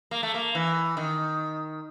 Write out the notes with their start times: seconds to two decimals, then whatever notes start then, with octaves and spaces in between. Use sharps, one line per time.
0.11 A#3
0.23 A3
0.34 A#3
0.55 E3
0.97 D#3